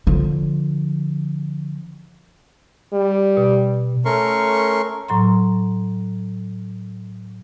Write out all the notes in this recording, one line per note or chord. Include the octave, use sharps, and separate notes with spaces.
D3 F3
G3
B2
A3 C#4 A#4 C6 C#6
A2 F#3 A#5 C6